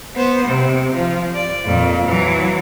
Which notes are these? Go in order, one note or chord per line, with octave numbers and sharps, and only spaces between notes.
B3 C5
C3
F3
D5
F2 A#2
E3 F#3